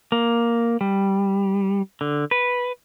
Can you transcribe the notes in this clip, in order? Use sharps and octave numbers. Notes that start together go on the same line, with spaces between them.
A#3
G3
D3
B4